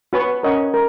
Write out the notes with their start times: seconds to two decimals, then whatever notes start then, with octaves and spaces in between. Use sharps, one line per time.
0.13 B3 F#4 C#5 G#5 C#6
0.43 C#4 A#4 D#5 F#5 C#6
0.74 A#4